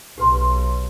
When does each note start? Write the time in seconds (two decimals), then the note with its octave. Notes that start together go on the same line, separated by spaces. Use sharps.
0.18 B1 G4 B4 C6